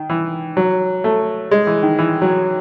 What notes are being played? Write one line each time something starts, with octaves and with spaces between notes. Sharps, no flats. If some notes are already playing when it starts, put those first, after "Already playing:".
Already playing: D#3
E3
F#3
A3
G#3
E3
D#3
E3
F#3